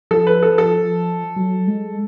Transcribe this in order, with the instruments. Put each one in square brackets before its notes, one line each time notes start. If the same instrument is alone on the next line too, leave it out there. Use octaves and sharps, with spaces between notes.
[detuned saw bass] F3 [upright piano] A4
[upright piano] B4
A4
A4
[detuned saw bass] F#3
G#3